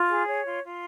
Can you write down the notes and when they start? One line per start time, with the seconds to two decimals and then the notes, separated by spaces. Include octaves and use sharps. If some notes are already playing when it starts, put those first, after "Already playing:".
Already playing: F4
0.09 G#4
0.27 C#5
0.45 F4
0.63 F4